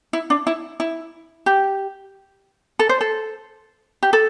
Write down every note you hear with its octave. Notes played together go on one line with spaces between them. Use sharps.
E4
D4
E4
E4
G4
A4
C5
A4
G4
A4